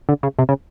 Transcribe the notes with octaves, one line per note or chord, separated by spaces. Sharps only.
D3
C#3
C3
C#3